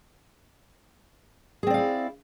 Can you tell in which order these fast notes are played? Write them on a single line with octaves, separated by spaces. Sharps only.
G#4 C4 D5 F5 E4